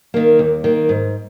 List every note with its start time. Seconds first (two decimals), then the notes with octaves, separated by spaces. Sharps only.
0.14 D#3 A#3
0.39 D#2
0.64 D#3 A#3
0.89 G#2